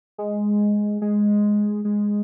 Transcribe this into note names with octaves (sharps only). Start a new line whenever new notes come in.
G#3
G#3
G#3